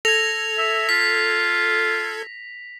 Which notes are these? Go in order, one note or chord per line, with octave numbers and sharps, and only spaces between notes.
A4 G#6 A#6 F7
E5
F4 B6